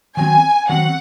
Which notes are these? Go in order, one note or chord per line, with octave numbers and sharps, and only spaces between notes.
D#3 F#3 C4 G#5
D#3 F#3 C4 F#5